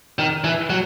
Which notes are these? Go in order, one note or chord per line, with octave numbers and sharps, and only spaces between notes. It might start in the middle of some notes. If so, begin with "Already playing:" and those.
D#3
E3
F#3